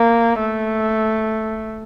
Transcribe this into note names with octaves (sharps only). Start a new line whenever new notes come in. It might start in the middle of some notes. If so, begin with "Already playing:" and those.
Already playing: A#3
A3